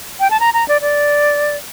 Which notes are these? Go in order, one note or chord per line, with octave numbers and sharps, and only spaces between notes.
G5
A5
A#5
A#5
D5
D5